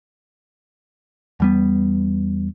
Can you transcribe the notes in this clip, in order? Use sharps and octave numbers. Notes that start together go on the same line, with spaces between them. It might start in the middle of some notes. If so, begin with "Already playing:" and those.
E2 G3 B3